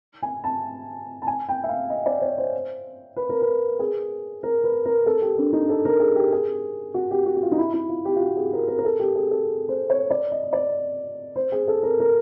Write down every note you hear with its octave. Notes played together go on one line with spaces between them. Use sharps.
G#5
A5
A5
G#5
G5
E5
F5
D#5
D5
C#5
C5
B4
A#4
B4
G#4
A#4
B4
A#4
A4
G4
D4
D#4
A4
A#4
G#4
G4
G#4
F#4
G4
F#4
F#4
F4
D#4
E4
E4
F4
G4
F4
F#4
G#4
A#4
A#4
A#4
A4
G4
G#4
A4
C5
C#5
D5
D#5
D#5
D5
C5
G#4
A4
A#4
A#4